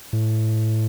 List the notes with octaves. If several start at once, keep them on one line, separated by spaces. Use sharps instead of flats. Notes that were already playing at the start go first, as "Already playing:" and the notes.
A2